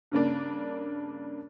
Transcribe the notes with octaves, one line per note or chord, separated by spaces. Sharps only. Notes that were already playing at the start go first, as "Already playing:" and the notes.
G2 C#3 A#3 D4